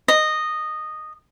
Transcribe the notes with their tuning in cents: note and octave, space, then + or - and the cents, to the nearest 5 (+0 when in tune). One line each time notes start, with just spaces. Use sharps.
D#5 -10